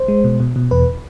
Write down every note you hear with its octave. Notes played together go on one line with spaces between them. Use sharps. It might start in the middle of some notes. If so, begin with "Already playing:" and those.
Already playing: C5
G#3
B2
B2
B2
E2 B4